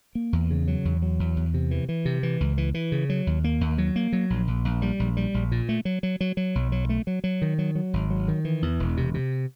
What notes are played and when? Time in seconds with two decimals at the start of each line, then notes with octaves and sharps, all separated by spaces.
0.15 A#3
0.33 E2
0.50 C#3
0.68 F#3
0.85 E2
1.02 F#3
1.19 E2
1.37 E2
1.54 C3
1.71 E3
1.89 E3
2.05 C3
2.23 E3
2.40 C#2
2.58 E3
2.74 E3
2.92 C#3
3.10 F#3
3.27 D#2
3.44 A#3
3.61 D#2
3.78 F#3
3.96 A#3
4.13 F#3
4.30 A#1
4.48 A#1
4.65 A#1
4.82 G3
5.00 A#1
5.17 G3
5.34 A#1
5.52 A#2
5.69 A3
5.85 F#3
6.03 F#3
6.21 F#3
6.37 F#3
6.55 B1
6.72 F#3
6.89 A3
7.07 F#3
7.24 F#3
7.42 D#3
7.59 F#3
7.75 F#3
7.93 G#1
8.10 F#3
8.28 D#3
8.45 E3
8.62 E2
8.80 E1
8.97 C3
9.14 C3